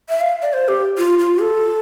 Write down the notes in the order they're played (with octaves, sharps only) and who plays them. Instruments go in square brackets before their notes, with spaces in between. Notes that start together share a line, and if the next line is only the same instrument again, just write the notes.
[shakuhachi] E5
F5
D5
C5
G4
F4
F4
A4